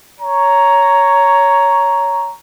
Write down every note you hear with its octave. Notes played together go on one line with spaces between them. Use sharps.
C#5 A#5